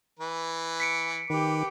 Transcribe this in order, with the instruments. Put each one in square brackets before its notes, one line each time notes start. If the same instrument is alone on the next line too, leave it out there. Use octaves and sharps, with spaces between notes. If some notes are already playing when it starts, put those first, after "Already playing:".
[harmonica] E3 B4
[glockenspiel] B6 C#7 D7
[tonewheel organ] D#3 [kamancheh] G4 D6 [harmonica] B4